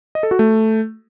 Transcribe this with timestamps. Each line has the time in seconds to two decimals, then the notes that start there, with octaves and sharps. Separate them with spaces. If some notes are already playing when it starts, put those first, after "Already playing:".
0.15 D#5
0.23 A4
0.31 F#4
0.39 A3